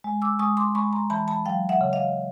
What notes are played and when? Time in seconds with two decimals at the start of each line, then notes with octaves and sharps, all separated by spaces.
0.04 G#3
0.22 D6 E6
0.39 G#3 C#6 D#6
0.57 C6 D6
0.75 G#3 B5 C#6
0.92 A#5 C6
1.10 E3 A5 B5
1.28 A5 B5
1.46 F#3 F5 G5
1.69 E5 F#5
1.81 C#3
1.93 D#5 F5